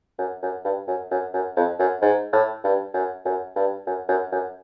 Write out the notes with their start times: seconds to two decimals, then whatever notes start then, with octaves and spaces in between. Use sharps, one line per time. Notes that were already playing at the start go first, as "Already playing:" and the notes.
0.19 F#2
0.43 F#2
0.65 G2
0.88 F#2
1.11 F#2
1.34 F#2
1.57 F2
1.79 F#2
2.02 G#2
2.33 A2
2.64 G2
2.94 F#2
3.26 F#2
3.56 G2
3.87 F#2
4.09 F#2
4.32 F#2